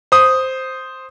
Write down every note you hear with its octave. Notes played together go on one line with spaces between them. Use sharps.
C5 D#6